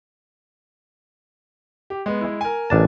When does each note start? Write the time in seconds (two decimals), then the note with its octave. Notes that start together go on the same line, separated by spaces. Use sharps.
1.90 G4
2.06 G#3 B3
2.21 G#3 E4
2.41 A#4 G#5
2.70 A1 D4 A5